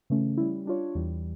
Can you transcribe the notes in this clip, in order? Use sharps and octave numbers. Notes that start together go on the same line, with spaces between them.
C#3 E3 A3 C#4
G3 C#4 E4
G3 D4 F4 C#5
E2 E3 G3